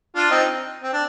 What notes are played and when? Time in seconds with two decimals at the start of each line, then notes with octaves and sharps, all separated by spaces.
0.16 D4 F4
0.30 C4 D#4
0.83 C4
0.93 D4